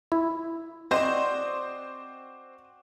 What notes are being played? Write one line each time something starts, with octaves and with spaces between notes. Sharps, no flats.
E4
C4 F#4 C5 D5 D#5